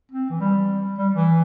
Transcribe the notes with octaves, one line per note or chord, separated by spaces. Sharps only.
C4
E3
G3
G3
E3